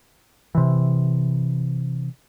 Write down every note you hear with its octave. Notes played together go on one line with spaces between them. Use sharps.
C3 E3